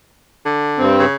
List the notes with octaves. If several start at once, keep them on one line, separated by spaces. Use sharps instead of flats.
D3
G2 C4
C#3